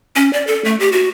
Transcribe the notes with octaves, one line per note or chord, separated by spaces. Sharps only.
C#4
D5
A4
A3
G4
F#4